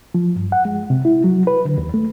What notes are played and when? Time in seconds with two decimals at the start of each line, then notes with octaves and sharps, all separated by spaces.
0.14 F3
0.36 G2
0.52 F#5
0.65 G#3
0.90 C3
1.05 E4
1.24 F#3
1.47 B4
1.65 D3
1.78 D#2
1.94 A3